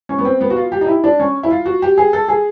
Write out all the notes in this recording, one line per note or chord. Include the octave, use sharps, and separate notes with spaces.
C#4
B3
C4
B3
F#4
F4
G4
D#4
E4
D4
C#4
E4
F4
F#4
G4
G#4
A4
G#4